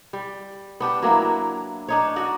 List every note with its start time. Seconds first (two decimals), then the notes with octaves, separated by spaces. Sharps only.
0.13 G3
0.80 B3 D4 G4
1.02 F#3 A#3 D4 E4
1.89 D4 D#4 C#5
2.16 F#4 D5 D#5 F#5